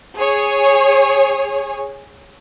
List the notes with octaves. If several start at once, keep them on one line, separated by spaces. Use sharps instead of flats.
G#4 C#5